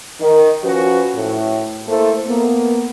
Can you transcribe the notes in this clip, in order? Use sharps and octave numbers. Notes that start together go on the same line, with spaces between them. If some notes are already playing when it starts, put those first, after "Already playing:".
D#3
F3 C#4 F#4 B4
A2
A3 A#3 E4 A4 C5
A#3 B3